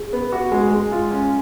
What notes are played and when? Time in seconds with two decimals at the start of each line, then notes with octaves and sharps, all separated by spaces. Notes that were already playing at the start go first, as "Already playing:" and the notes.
Already playing: G#4
0.13 B3
0.32 F#4
0.52 G#3
0.71 G#3
0.92 F4
1.11 C#4